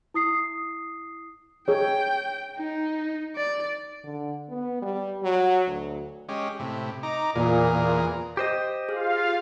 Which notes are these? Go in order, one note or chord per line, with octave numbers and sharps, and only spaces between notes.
E4 D#6 C7
G#4 C#5 G5
D#4
D5
D3
B3
G3
F#3
D2
G#3 C#4 G4
A2 C3
D#4 A#5 D6
E2 A#2 G#4 A#4
A#2
G4 C5 D#5
F4 G#4 F5